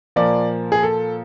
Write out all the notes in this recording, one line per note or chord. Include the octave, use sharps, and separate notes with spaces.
A#2 F3 A#3 D5
G#4
A4